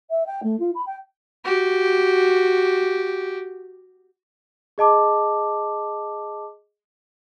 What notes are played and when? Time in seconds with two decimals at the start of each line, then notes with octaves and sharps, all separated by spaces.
0.10 E5
0.26 G5
0.43 A3
0.59 F4
0.75 B5
0.86 G5
1.45 F#4 G4
4.78 G#4 D#5 A5 D6